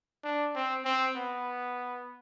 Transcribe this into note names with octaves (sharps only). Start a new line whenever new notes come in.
D4
C4
C4
B3